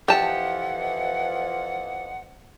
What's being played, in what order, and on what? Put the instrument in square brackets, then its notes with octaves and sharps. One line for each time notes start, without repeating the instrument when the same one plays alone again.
[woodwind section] F2 E3 F3 [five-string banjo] G4 A5 [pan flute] F#5